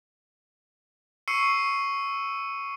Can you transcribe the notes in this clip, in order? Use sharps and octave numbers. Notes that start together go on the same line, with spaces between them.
C#6 E6 C7 C#7 D#7